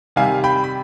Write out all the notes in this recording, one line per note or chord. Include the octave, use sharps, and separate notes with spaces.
C3 D#3 G3 F5 G#5
G5 B5
B5